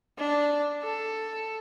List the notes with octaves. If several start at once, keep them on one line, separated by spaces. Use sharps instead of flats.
D4
A4